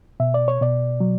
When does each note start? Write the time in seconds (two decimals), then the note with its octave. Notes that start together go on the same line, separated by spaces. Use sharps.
0.20 B2 E5
0.34 D5
0.48 C#5
0.61 B2 D5
1.00 F#3